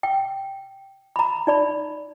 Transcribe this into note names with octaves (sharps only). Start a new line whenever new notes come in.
G5
A#5 B5
D#4 D5 B5